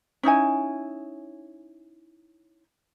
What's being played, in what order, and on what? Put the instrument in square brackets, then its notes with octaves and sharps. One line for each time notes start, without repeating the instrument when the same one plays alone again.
[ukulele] C#4 D#4 E4 G#5